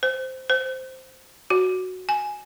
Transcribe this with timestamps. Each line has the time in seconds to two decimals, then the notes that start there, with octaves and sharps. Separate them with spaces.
0.03 C5
0.50 C5
1.50 F#4
2.09 G#5